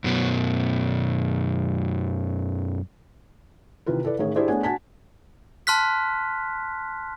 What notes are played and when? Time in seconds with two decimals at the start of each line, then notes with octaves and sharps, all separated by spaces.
0.04 F#2 B2
3.86 C3 D#3 E3 F4 B4
4.04 E4 A4 B4 D5
4.19 A1 A2 D#3 G#4 A#4 C#5
4.36 D4 E4 G4 G#4 C5 D5
4.48 A3 B3 D4 G#4 C#5 G#5
4.63 D4 F#4 G#5 A5 B6
5.67 A5 C6 F6 F#6 B6